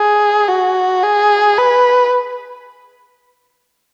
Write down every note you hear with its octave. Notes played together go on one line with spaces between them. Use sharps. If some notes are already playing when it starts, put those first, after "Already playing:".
Already playing: G#4
F#4
G#4
B4